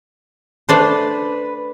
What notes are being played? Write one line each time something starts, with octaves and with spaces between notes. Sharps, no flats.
A3 D4 B4 C5